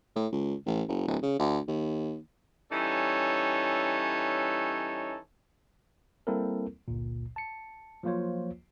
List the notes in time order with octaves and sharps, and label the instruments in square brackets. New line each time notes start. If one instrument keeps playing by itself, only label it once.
[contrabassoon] A2
C#2
A1
F#1
D1
C#3
D2
D#2
[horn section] E3 G3 C#4 D#4 A4 C#5
[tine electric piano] G3 A#3 C4 E4 A4 A#4
G1 C#2 A#2
A5 C#7
F3 F#3 A#3 F4 C5 C#5